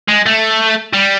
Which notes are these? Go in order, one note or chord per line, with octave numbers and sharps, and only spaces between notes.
G#3
A3
G3